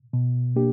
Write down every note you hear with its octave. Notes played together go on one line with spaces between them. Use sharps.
B2
A#3 D4 G4